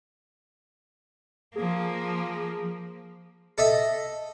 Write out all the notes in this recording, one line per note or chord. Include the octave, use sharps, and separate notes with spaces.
F3 A#3 G#4
A4 D#5 E5